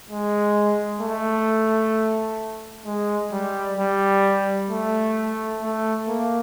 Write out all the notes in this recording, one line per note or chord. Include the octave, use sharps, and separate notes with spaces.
G#3
A3
G#3
G3
G3
A3
A3
A#3